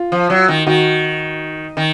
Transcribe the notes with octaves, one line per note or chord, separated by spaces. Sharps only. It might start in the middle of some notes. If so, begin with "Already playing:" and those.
Already playing: F4
F3
F#3
D#3
D#3 F#4
D#3